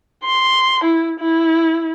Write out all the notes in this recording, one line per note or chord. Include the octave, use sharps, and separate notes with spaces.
C6
E4
E4